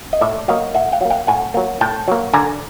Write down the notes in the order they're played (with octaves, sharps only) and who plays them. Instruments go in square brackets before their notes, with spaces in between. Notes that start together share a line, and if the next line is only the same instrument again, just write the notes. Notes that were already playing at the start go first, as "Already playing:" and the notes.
[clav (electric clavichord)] D#5
A2 D5 E5
F#3 A#3 D#5 F5
A2 E5 F#5
F5 G5
F#3 A#3
F5 G5
A2 F#5 G#5
F#3 A#3
A2 G5 A5
F#3 A#3
D3 G#5 A#5